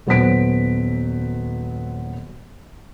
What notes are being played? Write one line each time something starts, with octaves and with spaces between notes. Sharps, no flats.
D#1 F#3 B3 C5 B6 D7